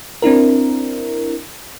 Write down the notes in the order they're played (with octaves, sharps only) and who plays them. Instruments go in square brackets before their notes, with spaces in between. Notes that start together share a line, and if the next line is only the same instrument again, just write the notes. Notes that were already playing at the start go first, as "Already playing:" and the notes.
[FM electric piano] C4 D4 E4 A#4